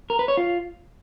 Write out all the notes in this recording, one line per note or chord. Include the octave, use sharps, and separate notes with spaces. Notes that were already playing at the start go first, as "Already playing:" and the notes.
A#4
B4
C#5
F4